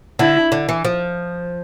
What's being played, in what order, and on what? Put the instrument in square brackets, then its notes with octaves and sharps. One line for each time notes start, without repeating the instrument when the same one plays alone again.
[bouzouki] D3 [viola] E4
[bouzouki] D3
E3
F3